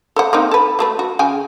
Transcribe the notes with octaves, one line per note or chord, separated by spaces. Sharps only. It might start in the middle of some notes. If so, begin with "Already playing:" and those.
A4 C5 F#5
A#3 C4 D#4
A4 B4
F#3 A3 B4
F#4
C#3 G5 G#5